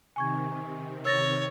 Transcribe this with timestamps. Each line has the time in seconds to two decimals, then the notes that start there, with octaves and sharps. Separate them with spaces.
0.16 C3 D#3 G#5 C#6 G#6
1.05 C#5 E6 A6 A#6